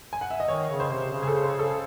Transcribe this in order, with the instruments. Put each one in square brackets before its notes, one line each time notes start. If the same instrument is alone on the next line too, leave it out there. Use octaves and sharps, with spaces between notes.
[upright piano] G#5
F#5
E5
D#5
[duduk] D#3 [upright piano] C#5
[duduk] C#3
[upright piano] C5
[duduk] C3
C#3
[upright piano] G#4
A4
C5
A4